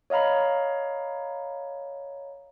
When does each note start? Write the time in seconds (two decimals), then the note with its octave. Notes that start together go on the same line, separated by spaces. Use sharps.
0.10 C#5 D#5 F5 A#5 B5